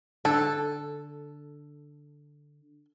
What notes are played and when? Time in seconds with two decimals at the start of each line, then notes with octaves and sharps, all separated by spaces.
0.25 D3 A4